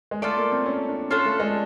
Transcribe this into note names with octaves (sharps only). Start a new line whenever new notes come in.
G#3
A3 F4 A4 D5
A#3
C4
C#4
D4
C#4 D4 F4 A4
A3
G#3